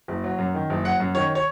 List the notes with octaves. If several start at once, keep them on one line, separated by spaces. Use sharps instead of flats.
F#1
F#3
F#2
D#3
F#1
F#3 F#5
F#2
D#3 C#5
C#5